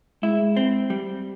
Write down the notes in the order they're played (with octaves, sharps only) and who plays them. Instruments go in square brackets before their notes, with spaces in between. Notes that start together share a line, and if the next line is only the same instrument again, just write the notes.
[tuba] G#3 [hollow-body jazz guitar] E4
[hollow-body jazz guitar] C4
G3